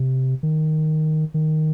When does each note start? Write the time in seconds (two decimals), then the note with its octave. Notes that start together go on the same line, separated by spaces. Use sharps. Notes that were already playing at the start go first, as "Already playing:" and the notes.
Already playing: C3
0.43 D#3
1.34 D#3